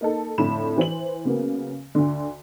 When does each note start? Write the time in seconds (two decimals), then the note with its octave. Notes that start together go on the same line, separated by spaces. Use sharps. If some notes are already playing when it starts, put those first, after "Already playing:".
0.01 A#3 D#4 A4
0.38 F2 A2 D3 A4 B5 E7
0.77 E3 C5 F#7
1.25 C#3 F#3 A#3 B3
1.95 D2 D3